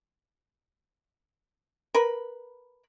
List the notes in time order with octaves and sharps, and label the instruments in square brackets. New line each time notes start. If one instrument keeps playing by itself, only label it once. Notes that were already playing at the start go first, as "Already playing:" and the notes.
[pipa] A#4 B4 B5